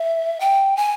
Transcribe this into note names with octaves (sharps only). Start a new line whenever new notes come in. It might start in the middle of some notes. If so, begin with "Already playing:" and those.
Already playing: E5
G5
G#5